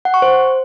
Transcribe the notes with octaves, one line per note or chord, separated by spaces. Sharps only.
F#5
C#6
C5